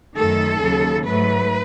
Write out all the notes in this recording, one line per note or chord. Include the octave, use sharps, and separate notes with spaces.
F#2 D#3 A3 A4
D#2 C#3 F#3
G#2 F#3 A3 B4